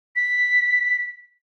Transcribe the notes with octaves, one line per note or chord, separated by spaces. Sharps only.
B6